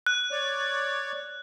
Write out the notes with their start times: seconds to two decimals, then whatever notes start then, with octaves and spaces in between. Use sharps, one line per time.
0.06 F#6
0.31 C#5 D5